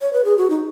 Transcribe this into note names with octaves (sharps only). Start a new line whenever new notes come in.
C#5
B4
G#4
F#4
D#4